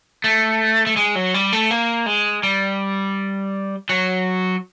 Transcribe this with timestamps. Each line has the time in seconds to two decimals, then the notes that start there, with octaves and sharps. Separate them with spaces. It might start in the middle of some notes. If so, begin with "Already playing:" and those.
0.24 A3
0.87 A3
0.97 G#3
1.15 F#3
1.34 G3
1.52 A3
1.71 A#3
2.06 G#3
2.43 G3
3.89 F#3